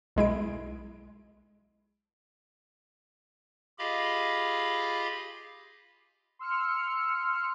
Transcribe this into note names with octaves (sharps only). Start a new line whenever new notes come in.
B1 G#3 E4 D7
F4 G4 G#4 D#5 F5 B5
C6 E6 F6 C#7